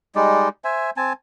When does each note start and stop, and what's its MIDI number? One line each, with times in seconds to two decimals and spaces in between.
0.15 0.49 55
0.15 0.49 56
0.15 0.49 63
0.15 0.49 74
0.64 0.90 72
0.64 0.90 76
0.64 0.90 80
0.97 1.13 60
0.97 1.13 80
0.97 1.13 81